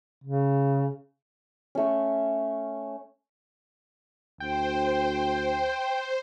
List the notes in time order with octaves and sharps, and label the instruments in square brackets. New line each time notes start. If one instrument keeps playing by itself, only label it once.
[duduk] C#3
[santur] A3 C#4
[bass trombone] D2 [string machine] C5 [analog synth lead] G5